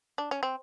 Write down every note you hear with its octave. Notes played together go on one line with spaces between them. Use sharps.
D4
C#4
C4